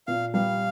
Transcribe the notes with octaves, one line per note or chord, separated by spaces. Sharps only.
A#2 F5
G3 F5